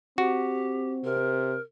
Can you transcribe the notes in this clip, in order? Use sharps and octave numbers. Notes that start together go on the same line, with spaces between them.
C4 F#4 G4
C3 A#4